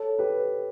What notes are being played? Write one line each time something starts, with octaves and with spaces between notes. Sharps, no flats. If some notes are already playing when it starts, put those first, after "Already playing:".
Already playing: A4 C#5
G4 B4